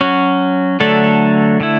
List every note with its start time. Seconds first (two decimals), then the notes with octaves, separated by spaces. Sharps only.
0.01 F#3 C#4 F#4
0.80 D3 F#3 A3 D4 A4
1.60 D3 A3 E4